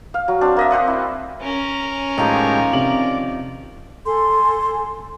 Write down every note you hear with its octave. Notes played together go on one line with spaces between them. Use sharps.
F5
F#3
C4 D4
A#3 D#5 E5
C4 C5 F#5 D#6
E4
C#4 A#4
A2 D#3 F3 G#3 G4 A#5
C3 D5 F#7
A4 G#5 C6